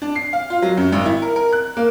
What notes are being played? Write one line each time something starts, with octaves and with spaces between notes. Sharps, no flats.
D4
C7
F5
F4
F#3
F#2
G#1
E4
A#4
A#4
F#6
A#3